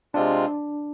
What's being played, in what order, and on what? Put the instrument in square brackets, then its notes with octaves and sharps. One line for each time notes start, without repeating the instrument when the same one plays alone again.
[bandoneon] C3 G#3 C4 F4 [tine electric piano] D4